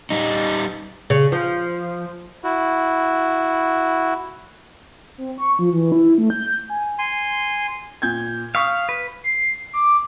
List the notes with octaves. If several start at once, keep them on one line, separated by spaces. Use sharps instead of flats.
G3 D#4
C#3
F3
E4 F#4
C4
C#6
F3
E3
E4
A3
G6
G#5
G#5 C6
A#2 G6 G#6
F5 C#6 D#6 B6
B4
C7
D6